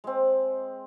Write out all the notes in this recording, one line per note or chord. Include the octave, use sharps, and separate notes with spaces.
G#3 C4